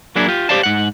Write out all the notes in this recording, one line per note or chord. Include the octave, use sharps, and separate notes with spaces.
F#3 A#3 D4 E4 G#4
F4 G4
G4 C5 D5 F5 A5
G#2 F#5